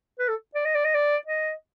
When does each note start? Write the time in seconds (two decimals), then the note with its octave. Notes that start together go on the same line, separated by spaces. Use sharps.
0.19 B4
0.28 A4
0.55 D5
0.65 D#5
0.75 D5
0.85 D#5
0.94 D5
1.27 D#5